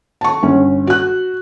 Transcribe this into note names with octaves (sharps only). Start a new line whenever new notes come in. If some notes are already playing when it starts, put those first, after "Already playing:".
A5 C#6
G1 C#4
F#4 F#6